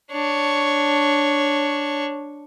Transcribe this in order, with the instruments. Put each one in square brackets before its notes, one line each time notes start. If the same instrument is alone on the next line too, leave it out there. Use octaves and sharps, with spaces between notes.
[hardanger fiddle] D4 C#5